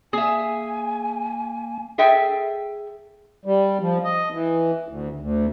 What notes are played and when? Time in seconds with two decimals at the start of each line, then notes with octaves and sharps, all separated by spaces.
0.13 A#3 G#4 E5 G#5
1.98 G#4 A4 E5 G5 G#5
3.45 G3
3.81 F3
4.04 D#5
4.32 E3
4.88 D2
5.20 D2